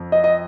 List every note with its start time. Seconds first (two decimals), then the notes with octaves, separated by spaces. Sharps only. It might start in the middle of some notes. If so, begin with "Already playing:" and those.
Already playing: F2
0.12 D#5
0.24 D#5